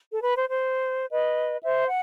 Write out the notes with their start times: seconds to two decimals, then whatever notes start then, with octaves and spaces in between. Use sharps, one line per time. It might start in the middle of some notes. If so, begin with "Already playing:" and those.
0.11 A4
0.23 B4
0.36 C5
0.49 C5
1.12 B4 D#5
1.62 C5 E5
1.87 F#5